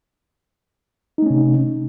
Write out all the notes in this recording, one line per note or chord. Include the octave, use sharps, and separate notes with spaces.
C3 A3 C#4 D#4